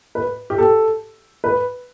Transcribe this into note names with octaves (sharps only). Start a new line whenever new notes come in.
B4
G4
A4
B4